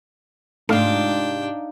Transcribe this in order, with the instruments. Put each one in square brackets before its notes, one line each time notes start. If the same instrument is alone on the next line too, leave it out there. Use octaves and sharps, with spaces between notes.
[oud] G#2 C3 F4 [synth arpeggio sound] A3 [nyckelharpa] D4 G5 [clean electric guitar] D#4 F5